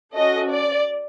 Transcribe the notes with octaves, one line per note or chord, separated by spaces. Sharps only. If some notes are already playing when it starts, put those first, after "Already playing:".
C#4 F#4 A4 D#5
D5